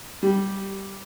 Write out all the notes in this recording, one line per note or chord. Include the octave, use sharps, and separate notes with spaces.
G3